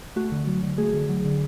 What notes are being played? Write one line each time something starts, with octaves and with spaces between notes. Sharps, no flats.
A3 F#4
D3
F#3
D3
A3 G#4
D3
F#3
D3